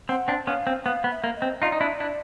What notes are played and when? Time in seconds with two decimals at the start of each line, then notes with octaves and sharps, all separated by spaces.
0.09 C4 F#5
0.28 C4 D4
0.47 B3 C#4 F5
0.67 C4
0.85 B3 F5
1.04 B3
1.11 E5
1.24 A#3
1.36 D#5
1.42 C4
1.62 D#4 F4 D#5
1.66 D5
1.72 D#4
1.81 D4 E4
2.00 D4 E4